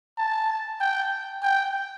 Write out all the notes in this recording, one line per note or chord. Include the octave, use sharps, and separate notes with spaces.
A5
G5
G5